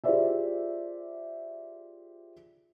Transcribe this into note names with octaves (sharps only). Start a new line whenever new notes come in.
F4 G4 G#4 C5 D5 E5